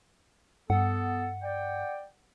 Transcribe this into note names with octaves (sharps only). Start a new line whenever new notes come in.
G2 B3 A4 F#5
D5 G5